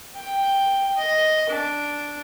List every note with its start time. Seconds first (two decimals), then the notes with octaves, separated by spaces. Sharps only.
0.16 G5
0.97 D#5
1.50 D4